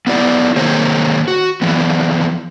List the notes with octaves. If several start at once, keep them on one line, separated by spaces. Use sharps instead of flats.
B3 E4 G4 D5
D#3 A#3 G#4 C5 C#5
F#4
E2 E3 F3 B3